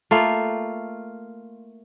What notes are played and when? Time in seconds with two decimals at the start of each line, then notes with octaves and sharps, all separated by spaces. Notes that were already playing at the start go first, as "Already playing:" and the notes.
0.11 A3 A#3 F4